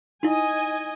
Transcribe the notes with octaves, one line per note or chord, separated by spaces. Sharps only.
D#4 E4 D#5 G#5